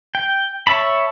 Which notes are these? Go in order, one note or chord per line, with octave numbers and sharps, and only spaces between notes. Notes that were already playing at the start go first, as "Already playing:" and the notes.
G5
C#5 E5 A5 B5